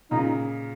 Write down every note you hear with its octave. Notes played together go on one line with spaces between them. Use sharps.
A#2 C#3 D#4